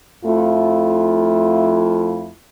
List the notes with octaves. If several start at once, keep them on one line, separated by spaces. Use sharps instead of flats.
F2 F3 A3 E4 F4